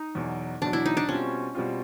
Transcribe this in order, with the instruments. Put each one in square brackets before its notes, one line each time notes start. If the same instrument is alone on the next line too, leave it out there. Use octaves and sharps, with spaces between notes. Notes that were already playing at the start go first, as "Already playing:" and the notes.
Already playing: [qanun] D#4
[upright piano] E2 B2 F#3
[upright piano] E2 B2 F#3 [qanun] D4
[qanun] E4
D#4
D4
[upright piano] B2 G3 C4 F4 [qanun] C#4
[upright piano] B2 G3 C4 F4